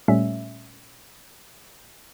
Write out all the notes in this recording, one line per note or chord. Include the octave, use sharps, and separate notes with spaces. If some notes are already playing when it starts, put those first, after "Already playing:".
A#2 G3 A3 C#4 E5